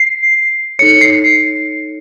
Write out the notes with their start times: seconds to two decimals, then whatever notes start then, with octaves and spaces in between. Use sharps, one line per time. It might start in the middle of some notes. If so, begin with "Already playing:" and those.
Already playing: C7
0.79 D#4 A4 C#5 C#7
1.01 C7